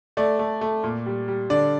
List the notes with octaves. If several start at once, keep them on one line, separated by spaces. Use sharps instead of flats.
A3 D5
A3
A3
A#2
G3
G3
D3 D5